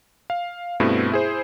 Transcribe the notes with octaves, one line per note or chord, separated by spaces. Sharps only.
F5
G2 B2 A3 B3 C4 E4
E4 G#4 C5